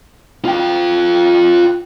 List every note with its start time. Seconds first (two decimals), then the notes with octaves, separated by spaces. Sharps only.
0.45 F4 G5